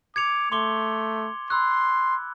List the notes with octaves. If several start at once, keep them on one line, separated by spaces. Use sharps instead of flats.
D6 G#6 C#7 F7
A3 C6 D6 G7
B5 C6 E6 F#6